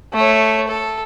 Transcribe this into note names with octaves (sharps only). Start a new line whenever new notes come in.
A3 C#5
A4